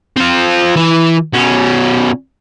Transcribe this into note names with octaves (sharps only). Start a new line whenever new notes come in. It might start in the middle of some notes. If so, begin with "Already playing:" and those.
C4 F4
E3
B2 C#4